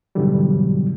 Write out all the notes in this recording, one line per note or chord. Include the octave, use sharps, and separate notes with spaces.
G#2 B2 D3 E3 F#3 G3